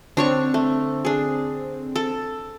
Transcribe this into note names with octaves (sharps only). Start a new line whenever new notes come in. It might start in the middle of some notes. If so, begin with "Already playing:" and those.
D3 C4 D4 C#5 C#6
A3
D4 G#4
A4